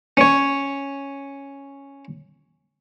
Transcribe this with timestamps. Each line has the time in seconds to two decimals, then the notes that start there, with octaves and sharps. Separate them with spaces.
0.17 C#4 C#5